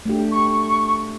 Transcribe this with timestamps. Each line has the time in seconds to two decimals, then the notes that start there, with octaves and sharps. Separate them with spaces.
0.05 A3 D4 G4
0.31 C#6